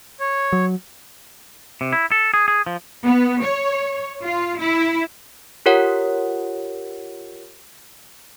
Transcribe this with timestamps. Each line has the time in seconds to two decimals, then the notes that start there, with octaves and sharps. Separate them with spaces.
0.20 C#5
0.52 F#3
1.81 C3
1.93 E4
2.12 A4
2.34 G#4
2.48 G#4
2.66 F3
3.04 B3
3.43 C#5
4.22 F4
4.58 E4
5.66 F4 G4 A#4 C#5 F#5